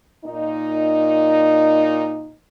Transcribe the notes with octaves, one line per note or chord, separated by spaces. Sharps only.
A#2 D#4